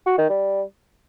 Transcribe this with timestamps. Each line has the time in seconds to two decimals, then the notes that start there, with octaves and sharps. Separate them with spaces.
0.06 F#4
0.18 D#3
0.29 G3